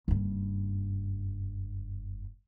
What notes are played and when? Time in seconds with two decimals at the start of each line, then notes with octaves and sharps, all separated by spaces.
0.08 F#1 G2